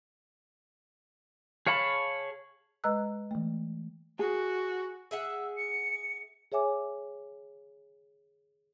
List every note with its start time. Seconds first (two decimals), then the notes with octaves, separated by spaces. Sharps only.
1.67 G#4 C#5 F5 A5 B5
2.84 G#3 B4 D#5 A#5 E6 F#6
3.31 E3 A3
4.19 F#4 G#4
5.11 G#4 E5 F#5 E6
5.56 C#7
6.52 G#4 C#5 E5 G#5 D6